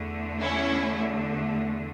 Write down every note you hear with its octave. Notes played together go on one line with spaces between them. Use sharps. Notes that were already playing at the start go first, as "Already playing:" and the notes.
Already playing: E2 D3 A3
C#4 E4